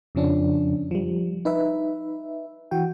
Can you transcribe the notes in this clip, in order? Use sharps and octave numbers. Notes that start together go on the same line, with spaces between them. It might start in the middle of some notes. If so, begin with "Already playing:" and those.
F2 C#3 F3 C#4 D4
F3 G3
D#4 B4 E5
E3 F#4 G5